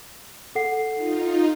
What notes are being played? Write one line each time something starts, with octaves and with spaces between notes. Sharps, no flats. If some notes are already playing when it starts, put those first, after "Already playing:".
A4 F#5 C7
D#4 F4